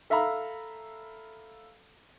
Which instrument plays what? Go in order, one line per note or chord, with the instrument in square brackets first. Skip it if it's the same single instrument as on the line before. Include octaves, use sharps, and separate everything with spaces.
[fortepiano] A4 E5 F5 A#5 B5